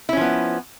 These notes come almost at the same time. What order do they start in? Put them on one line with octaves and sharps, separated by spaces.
E4 C#4 F3 B3